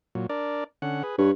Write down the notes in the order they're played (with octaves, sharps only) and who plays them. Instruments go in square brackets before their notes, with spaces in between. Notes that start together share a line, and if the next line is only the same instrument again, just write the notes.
[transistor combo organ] A#2 F#3
D4 A#4 D5
D3 C#4 F#5
G#4 B4
[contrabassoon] G2 [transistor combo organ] B4 C#5